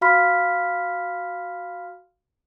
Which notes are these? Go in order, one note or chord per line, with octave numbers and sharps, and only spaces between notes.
F#4 F5 B5 C6 F6 B6